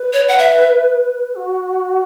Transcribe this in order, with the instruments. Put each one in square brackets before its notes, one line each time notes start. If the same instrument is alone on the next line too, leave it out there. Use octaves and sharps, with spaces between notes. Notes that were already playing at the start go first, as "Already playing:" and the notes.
Already playing: [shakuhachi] B4
[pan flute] C#5
F#5
E5
[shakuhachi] F#4